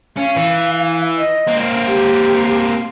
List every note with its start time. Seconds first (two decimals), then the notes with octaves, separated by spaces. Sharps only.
0.17 C#4 F5
0.36 E3
1.18 D#5
1.48 A#3 C4
1.87 G4